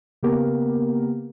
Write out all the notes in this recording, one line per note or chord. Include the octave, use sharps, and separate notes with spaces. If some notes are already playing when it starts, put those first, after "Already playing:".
C#3 A#3 B3 G4 A#4